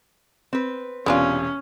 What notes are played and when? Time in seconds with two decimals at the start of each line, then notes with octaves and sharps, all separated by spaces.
0.53 C4 B4
1.06 E1 C3 B3 C#4 D4 F4 G#5